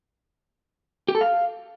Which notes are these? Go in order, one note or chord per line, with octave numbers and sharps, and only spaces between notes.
G4
A4
F5